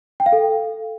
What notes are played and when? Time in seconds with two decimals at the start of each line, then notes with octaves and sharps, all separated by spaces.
0.20 G5
0.26 F5
0.32 A4